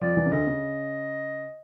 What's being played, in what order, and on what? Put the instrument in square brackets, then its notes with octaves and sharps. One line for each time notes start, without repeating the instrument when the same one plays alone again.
[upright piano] F2 F3 [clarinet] D5
[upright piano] E2 E3
C#3
[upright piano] D2 D3 [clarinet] D#5
[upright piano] C#3